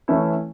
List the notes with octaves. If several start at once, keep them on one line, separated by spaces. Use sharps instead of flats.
E3 A3 C#4 E4